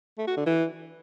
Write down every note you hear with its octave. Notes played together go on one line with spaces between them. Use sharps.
A3
F#4
D3
E3